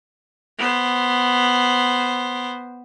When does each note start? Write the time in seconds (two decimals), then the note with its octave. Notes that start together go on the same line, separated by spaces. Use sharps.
0.58 B3 C5